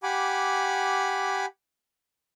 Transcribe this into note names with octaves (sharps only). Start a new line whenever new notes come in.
G4 F#5 G#5 B5 D6